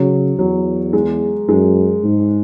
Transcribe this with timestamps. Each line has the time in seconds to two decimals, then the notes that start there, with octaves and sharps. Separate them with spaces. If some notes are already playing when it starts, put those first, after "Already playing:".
Already playing: C#3 F#3
0.39 E2 F#3
0.93 G#3
1.49 F#2 G#3
2.03 G#2